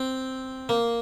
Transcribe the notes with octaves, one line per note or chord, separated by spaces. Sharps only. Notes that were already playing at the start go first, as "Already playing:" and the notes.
Already playing: C4
A#3